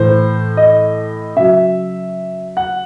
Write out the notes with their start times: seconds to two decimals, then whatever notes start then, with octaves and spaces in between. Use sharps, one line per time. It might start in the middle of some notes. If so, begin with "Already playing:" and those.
Already playing: A2 E3 C5
0.57 D#5
1.36 C#3 F#3 E5
2.57 F#5